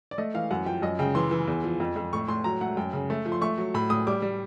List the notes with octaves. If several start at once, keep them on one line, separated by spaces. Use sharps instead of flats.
D5
A3 D#5
E3 F5
F#2 F#5
F3 G5
F#2 D#5
C#3 G5
E3 C6
E3
E2
F3
F2
F2
A2 C#6
A2 C6
F#3 A#5
A3 F#5
F#2 G5
C#3
A3
F3
C6
A3 C#6
F#3
A2 B5
A2 D#6
G3 D6
G3